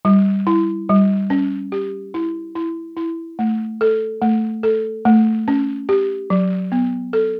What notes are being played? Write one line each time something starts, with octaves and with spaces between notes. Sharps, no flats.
G3
E4
G3
C#4
G4
E4
E4
E4
A3
A4
A3
A4
A3
C#4
G4
F#3
B3
A4